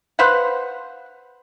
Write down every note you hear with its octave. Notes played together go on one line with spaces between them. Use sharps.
B4 C5 F5 F#5